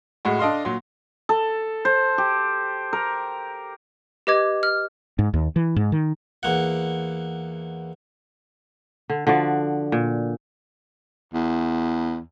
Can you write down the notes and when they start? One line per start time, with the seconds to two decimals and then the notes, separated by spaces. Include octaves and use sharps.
0.25 A2 G#3 F#4
0.39 D4 A4 D#5 F5 C6
0.65 A#2 F#3 C6
1.29 A4
1.85 C5
2.18 G4
2.93 A#4
4.27 G4 B4 D#5 D6 G#6
4.63 F6
5.19 G#2
5.34 D#2
5.56 E3
5.76 G#2
5.92 D#3
6.43 E2 A#3 F#5
9.10 D3
9.27 D3 F3 F#4 D5
9.92 A#2
11.34 E2